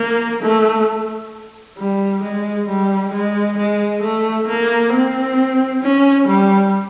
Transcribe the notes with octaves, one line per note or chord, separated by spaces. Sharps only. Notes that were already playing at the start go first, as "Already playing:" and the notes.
Already playing: A#3
A3
G3
G#3
G3
G#3
G#3
A3
A#3
C4
C#4
G3